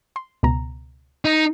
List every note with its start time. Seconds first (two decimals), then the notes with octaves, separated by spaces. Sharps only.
0.16 C6
0.43 C#2 B2 A#5
1.25 D#4